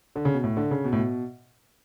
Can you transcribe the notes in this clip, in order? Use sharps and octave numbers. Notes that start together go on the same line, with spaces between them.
D3
C#3
B2
A2
D3
C#3
B2
A2
B2